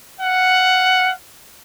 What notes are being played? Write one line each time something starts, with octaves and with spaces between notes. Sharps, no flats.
F5 F#5